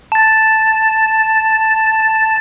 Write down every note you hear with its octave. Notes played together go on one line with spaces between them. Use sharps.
A5 A6